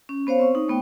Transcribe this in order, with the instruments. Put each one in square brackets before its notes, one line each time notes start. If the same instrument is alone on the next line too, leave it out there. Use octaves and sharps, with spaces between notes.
[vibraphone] C#4
B3 C5 C#5 F5
C4 C#6
D#4
A3 B3 G5